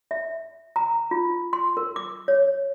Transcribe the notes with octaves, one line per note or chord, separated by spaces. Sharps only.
E5
A#5
F4
C6
A#4
D6
C#5